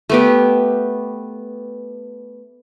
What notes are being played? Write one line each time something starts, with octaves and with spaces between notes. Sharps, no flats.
A3 B3 G4